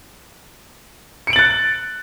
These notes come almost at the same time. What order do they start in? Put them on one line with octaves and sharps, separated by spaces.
C#7 D7 F#7 A6 F#6